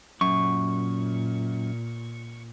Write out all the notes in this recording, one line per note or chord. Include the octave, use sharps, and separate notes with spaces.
F#2 A#2 C#6